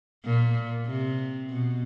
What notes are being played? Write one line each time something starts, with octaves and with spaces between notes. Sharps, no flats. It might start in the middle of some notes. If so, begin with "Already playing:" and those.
A#2
C3
B2